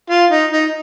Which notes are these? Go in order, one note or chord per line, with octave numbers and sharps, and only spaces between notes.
F4
D#4
D#4